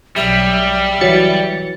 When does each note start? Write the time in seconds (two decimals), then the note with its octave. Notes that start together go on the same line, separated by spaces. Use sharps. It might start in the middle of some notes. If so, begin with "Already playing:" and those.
0.16 B1 F#3 G3 E5
1.01 E3 F#3 A6 C#7